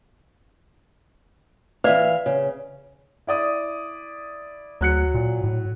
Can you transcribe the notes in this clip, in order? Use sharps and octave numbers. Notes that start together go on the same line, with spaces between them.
E3 B4 D5 E5 F5
C#3
E4 D5 D#6
D2 F#3 F#6 C#7
A#2
A2